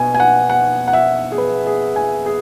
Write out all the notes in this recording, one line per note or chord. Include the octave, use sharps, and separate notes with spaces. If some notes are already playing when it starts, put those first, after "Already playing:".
Already playing: B2 B3 G#5
G#5
F#5
F#5
F#5
E5
G#4
B4
G#4
G#5
G#4